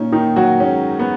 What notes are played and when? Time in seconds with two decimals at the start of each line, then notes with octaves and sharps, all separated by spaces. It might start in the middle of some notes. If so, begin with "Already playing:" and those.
Already playing: A#2 C#4 D#4
0.12 D#3 D#4
0.36 F#3 F#4
0.60 G#2 C#4
0.99 B3